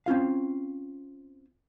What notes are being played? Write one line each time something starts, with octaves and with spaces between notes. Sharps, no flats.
C4 C#4 F4 F5